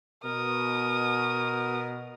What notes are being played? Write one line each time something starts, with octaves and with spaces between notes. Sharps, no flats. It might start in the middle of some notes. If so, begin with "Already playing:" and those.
B2 A#4 D#6